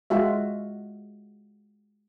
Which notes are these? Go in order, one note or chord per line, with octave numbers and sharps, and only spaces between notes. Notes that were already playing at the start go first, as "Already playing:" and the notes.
G#3 F4 F#4 E5